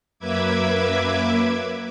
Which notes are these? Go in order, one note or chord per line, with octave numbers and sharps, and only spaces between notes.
F#2 A#3 B4 E5 D6 G#6